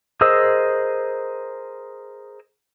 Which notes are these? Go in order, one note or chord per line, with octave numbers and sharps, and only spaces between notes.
G#4 A#4 C5 D#5 E6